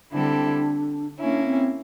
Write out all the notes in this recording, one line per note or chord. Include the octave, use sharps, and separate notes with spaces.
D3 G3 C4 D4 E4 A4
A#3 C#4 D4 E4
C4